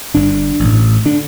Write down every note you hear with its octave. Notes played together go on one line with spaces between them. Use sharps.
G1 G2 D3 D4
A1
A2
D3 D4